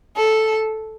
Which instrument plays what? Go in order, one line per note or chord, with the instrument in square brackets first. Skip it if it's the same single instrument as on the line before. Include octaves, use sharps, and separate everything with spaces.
[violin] A4